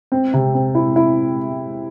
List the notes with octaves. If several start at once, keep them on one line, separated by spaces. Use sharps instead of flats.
C4
C3
C4
E4
E4